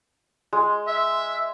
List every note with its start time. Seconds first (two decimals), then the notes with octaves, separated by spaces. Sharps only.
0.53 G#3
0.87 E5